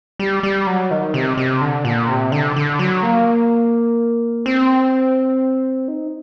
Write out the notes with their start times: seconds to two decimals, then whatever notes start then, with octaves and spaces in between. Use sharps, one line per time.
0.19 G3
0.43 G3
0.67 F#3
0.91 D#3
1.14 C3
1.37 C3
1.61 D3
1.85 A#2
2.09 C3
2.32 D3
2.56 D3
2.79 F#3
3.03 A#3
4.46 C4
5.88 D#4